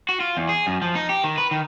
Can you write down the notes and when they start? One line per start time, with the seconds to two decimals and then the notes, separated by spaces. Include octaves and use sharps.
0.09 F#4
0.20 F4
0.37 E2
0.49 G#4
0.67 F#2
0.82 F3
0.95 D#4
1.09 G4
1.24 D#3
1.38 B4
1.51 D#3